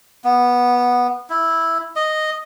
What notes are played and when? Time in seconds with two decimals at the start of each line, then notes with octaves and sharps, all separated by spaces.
0.24 B3
1.30 E4
1.96 D#5